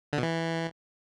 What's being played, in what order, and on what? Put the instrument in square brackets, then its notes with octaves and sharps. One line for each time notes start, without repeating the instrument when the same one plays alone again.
[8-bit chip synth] D3
B2
E3